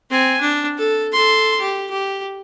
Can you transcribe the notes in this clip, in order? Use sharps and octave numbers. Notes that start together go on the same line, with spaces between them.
C4 G#5
D4
A4
A4 C6
G4
G4